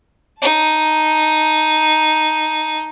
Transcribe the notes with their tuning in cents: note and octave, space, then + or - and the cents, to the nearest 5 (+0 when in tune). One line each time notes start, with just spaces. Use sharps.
D#4 +0 A5 +0